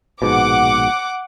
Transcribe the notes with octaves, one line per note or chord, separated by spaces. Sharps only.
A#1 G#2 B2 F#5 D6